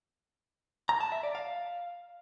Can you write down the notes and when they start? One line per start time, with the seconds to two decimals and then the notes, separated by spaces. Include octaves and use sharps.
0.89 A#5
1.01 A5
1.12 E5
1.23 D5
1.35 F5